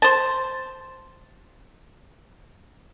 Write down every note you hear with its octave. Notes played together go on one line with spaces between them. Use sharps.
C5 A5